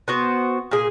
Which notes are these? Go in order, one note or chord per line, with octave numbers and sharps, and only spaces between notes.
B3 F#4 C5
A#2 G#4